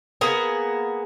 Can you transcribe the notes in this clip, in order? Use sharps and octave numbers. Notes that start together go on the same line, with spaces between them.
A#3 B3 G#4